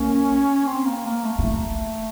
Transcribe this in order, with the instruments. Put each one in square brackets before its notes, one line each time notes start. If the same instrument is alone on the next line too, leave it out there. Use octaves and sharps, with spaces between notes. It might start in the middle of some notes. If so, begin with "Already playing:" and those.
Already playing: [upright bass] A#3 [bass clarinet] C#4
[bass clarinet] C4
A#3
A#3
A3
[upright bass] B3
[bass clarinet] A3 [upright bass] A#3